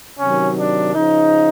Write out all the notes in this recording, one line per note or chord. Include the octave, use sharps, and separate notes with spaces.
C3 D#3 F#3 C#4
D4
C#3 F3 D#4